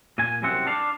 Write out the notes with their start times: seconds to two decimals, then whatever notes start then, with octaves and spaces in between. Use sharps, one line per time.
0.18 A#2 G#5
0.42 C2 F#2 C3 C4 F#5
0.66 D4 D5 F5